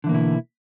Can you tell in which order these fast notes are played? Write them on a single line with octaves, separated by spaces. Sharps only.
D3 E3 A#3 B2 E4